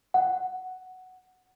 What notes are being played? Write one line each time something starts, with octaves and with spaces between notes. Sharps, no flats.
F#5